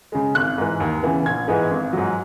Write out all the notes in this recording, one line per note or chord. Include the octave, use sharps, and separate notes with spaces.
C#3 G#3
G#1 F#6
G#2 E3
D#2
C#3 E3 B3
A#1 G#6
G#2 E3 G#3 B3
G#1
G#2 F#3